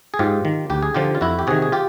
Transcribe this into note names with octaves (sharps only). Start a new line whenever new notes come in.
G#4
G#2 F4 G4
D#3
D2 G4
G#4
D3 F3 F4 G4
F4
F2 E4 F#4
G4
C3 D#3 F#4 G#4
G#4
F4 G4